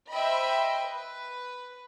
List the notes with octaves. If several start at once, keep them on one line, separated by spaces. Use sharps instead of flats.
C5 D#5 E5 G5 B5
B4